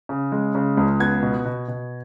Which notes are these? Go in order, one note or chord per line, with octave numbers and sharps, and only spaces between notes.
C#3
G#3
C#3
C#2
B3 G#6
B2
B2
B2